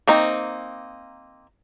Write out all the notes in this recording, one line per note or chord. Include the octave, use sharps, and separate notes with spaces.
A#3 C4 D#4